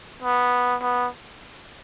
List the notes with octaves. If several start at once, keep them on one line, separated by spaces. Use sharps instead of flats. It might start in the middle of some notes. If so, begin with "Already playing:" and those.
B3
B3